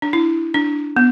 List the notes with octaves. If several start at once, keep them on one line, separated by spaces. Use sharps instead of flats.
D4
E4
D4
B3